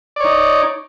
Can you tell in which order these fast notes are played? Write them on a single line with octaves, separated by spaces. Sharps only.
D5 C#5 D#4